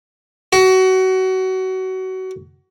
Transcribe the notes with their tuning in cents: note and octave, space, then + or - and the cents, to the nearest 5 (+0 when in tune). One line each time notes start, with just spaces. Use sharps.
F#4 +25